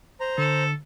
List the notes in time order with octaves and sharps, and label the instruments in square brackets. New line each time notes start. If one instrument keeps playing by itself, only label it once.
[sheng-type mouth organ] C5 A#5
[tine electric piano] D3 [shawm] A4